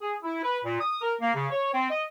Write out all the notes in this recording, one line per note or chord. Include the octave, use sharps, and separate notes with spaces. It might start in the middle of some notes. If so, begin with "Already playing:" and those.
G#4
E4
B4
A#2
D#6
A#4
A#3
C#3
C#5
C4
D#5